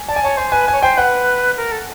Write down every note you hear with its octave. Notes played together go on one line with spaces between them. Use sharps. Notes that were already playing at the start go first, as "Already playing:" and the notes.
Already playing: G#5
D5 A5
G#5
C#5 A5
C5 G#5
B4 G#5
C#5 G#5
C5 G5
B4 F#5
A#4
A4